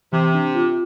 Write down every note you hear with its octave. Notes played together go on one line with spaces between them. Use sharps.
C3 E3
D4
F4